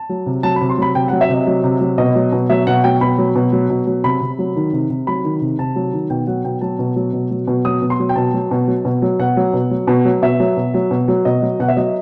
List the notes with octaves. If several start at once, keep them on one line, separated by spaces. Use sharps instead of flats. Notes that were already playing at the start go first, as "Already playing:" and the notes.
Already playing: A5
F#3
C3
F#3 A5
B5
C3
C6
F#3 B5
C3 G5
F#5
F#3
E5
C3 D#5
F#3
C3
F#3
B2 D#5
F#3
B2
F#3 E5
B2 F#5
F#3 G5
B2 B5
F#3
B2
F#3
B2
F#3
C3 B5
C3
F#3
D#3
C3
C3
F#3 B5
D#3
C3
C3 A5
F#3
D#3
B2 G5
F#3 F#5
B2 G5
F#3 A5
B2
F#3
B2
F#3
B2
F#3 D#6
B2
C6
F#3
G5
B2 A5
F#3
B2
F#3
B2
F#3
B2 F#5
F#3
B2
F#3
B2
F#3
B2 E5
F#3
B2
F#3
B2
F#3
B2 D#5
F#3
B2 F#5
E5
F#3 D#5